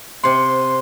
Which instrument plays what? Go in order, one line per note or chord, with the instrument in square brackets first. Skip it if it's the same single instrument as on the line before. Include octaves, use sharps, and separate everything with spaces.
[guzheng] C3 F#5 [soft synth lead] C6